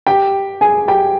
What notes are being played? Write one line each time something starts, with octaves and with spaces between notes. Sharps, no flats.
G4 G5
G#4 G#5
G4 G5